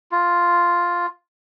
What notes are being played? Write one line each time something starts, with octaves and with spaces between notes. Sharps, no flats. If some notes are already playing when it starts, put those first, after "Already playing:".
F4